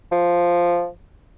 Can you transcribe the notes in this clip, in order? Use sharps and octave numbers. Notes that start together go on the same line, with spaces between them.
F3